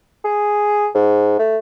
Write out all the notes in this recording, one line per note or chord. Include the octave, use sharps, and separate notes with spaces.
G#4
G#2
A3